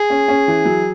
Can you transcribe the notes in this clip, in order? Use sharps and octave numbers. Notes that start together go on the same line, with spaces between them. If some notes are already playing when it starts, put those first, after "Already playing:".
Already playing: G#4
C#4
C#4
E3
F#3